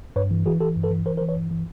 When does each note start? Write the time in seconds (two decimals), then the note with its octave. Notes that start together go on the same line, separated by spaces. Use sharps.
0.16 G2 B4 C#5
0.31 E3
0.46 E3 F#4 G#4
0.61 E3 G4 A4
0.76 G2
0.83 A4 B4
0.91 E3
1.06 E3 A#4 C5
1.17 A#4 C5
1.21 E3
1.29 B4 C#5
1.36 G2
1.51 E3